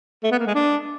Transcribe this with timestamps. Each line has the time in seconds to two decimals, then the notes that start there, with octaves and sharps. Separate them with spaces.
0.23 A3
0.31 B3
0.39 A#3
0.47 G#3
0.55 D4